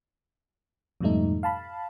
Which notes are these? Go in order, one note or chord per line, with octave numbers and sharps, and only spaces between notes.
F2 G#2 B2 G3 A3 D#4
F5 A5 B5